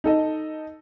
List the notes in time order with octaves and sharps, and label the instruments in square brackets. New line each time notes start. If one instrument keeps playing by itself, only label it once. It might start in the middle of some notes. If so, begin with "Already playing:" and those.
[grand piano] D#4 A4 D#5